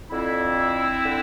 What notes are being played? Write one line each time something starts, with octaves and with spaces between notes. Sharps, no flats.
F2 D3 C4 E4
D3